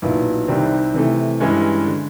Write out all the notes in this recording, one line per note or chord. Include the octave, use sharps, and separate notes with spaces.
B1 A#2 F#3 B3 E4
C2 C3 D#3 G3 C4
C3 E3 A3
G2 E3 G#3 C#4
D3